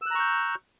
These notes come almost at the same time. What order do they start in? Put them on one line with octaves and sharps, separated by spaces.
E6 F#6 A#5 C#6 G6